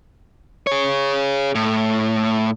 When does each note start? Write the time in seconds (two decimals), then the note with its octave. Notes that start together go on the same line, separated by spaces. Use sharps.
0.67 G#4 C#5
1.55 A2